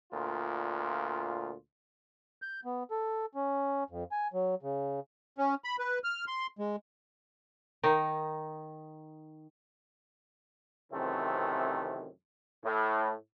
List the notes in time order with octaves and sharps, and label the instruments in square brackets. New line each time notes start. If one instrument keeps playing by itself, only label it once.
[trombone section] D2 A#2 F4
[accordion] G6
B3
A4
C#4
F2
G#5
F#3
C#3
C#4
B5
B4
F6
C6
G#3
[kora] D#3 D#4
[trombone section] F#2 C3 D#3 E3 A3 C4
A2